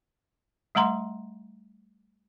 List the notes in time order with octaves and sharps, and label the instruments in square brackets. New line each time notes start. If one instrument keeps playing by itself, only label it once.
[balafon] G3 A3 F#5 A#5 C6